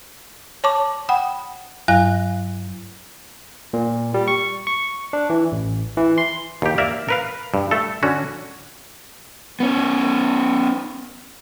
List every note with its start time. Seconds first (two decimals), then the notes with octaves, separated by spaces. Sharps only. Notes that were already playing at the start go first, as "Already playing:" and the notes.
0.64 C#5 A5 C#6 D6
1.09 F#5 G5 B5 D#6
1.88 G2 F#3 F5 F#6 A#6
3.73 A#2
4.14 G3
4.28 C#6
4.67 C#6
5.13 D4
5.30 E3
5.52 A1
5.97 E3
6.18 C6
6.62 D#2 G4
6.78 A#3 A#4 D5 E5
7.09 A#4 B4 F5
7.54 G2
7.71 A3 A4
8.03 D3 C#4 F#4
9.60 B3 C#4